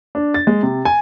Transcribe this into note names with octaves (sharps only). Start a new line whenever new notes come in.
D4
A6
G#3
C3
G#5